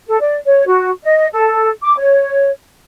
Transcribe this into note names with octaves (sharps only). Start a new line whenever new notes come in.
A4
D5
C#5
F#4
D#5
A4
D6
C#5